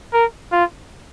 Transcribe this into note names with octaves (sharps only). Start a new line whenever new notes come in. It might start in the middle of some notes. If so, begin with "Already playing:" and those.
A#4
F4